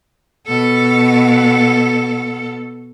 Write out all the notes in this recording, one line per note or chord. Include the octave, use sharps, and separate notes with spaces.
B2 A4